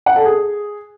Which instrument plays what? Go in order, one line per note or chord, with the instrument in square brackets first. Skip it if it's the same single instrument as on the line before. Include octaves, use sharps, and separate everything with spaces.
[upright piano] F#5
A4
G#4